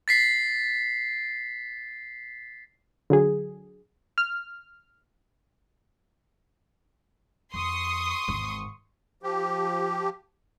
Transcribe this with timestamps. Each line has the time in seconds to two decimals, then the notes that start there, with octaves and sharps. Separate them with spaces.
0.08 A6 B6 C7
3.10 D3 F#3 G#4
4.18 F6
7.54 F2 C6 C#6 D#6
8.28 G#1 E2
9.23 F3 G4